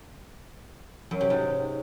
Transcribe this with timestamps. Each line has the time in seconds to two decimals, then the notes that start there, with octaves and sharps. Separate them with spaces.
1.11 F#2
1.21 C3
1.30 G#2